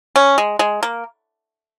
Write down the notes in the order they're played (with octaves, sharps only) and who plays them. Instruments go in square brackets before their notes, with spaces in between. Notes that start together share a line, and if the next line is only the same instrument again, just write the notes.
[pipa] C#4
G#3
G#3
A#3